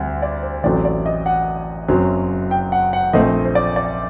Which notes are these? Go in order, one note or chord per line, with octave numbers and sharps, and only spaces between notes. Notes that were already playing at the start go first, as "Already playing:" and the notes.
Already playing: D2 G3 C4 F#5
D5
C5
A1 A2 F#3 A3 C4 D5
D5
D#5
F#5
F#1 F#2 F#3 C4
G5
F#5
F#5
A#1 A#2 A3 C4 D#5
C5
D5
D5